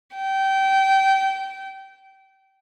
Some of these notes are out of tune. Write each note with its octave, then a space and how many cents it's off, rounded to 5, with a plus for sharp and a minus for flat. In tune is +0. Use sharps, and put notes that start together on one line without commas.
G5 -25